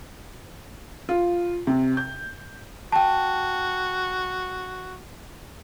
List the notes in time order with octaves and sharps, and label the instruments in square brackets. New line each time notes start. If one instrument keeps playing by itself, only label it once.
[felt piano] F4
C3
G6
[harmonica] F#4 [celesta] G5 A5